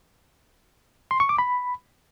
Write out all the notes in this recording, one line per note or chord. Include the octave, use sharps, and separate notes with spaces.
C6
C#6
D6
B5